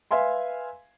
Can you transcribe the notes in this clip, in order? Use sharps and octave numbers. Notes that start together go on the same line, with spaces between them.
B4 E5 F5 G#5 C6